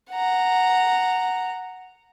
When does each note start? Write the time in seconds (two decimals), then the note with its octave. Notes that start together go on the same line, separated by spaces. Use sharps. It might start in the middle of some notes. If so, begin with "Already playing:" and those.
0.11 F#5 A#5